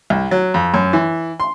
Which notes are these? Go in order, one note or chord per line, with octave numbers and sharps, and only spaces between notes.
C2
F#3
F2
F#2
E3
C6